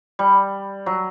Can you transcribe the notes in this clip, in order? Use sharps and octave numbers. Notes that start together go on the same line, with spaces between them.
G3
F#3